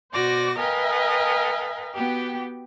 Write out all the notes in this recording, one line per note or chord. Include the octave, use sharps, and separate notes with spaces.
B2 F#4 C5 D5 D6 A#6
A#4 B4 D#5 F5 G5 G#5
B3 F#4 G4 G5